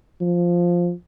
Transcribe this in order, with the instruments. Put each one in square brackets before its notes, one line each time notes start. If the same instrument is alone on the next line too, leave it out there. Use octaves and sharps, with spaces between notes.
[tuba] F3